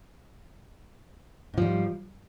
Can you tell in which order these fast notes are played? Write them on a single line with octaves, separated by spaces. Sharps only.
G#2 F3 G3